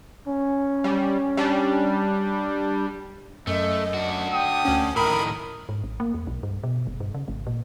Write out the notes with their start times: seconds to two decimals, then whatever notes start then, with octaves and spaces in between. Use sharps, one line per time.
0.28 C#4
0.84 G3
1.37 G3 D4
3.47 F#2 A3 D#5
3.94 D4 F#4
4.33 G5 D#6
4.65 D2 C#4
4.96 A2 D#3 A#4 A#5 B5 D#6
5.69 G#2
5.83 A1
6.00 A#3
6.14 E2
6.27 B1
6.43 G2
6.63 B2
6.87 F#1
7.00 G2
7.14 C#3
7.28 G#1
7.47 A#2